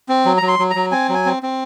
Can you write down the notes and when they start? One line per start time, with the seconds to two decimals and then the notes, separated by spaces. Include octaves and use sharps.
0.09 C4
0.26 F#3
0.37 A#5
0.42 F#3
0.48 C6
0.59 F#3
0.70 A#5
0.76 F#3
0.92 C4 G#5
1.09 F#3 G#5
1.26 C4
1.43 C4